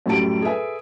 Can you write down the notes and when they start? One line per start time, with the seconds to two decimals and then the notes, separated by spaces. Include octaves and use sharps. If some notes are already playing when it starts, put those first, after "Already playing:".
0.06 F#2 A2 G3 C#4 A5 D7
0.42 G#4 A4 B4 E5 G#5